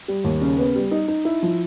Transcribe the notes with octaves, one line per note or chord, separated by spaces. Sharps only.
G3
D#2
C#3
B3
G3
D#4
D#4
E4
F3